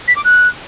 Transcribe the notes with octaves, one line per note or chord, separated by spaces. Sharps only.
B6
D6
F#6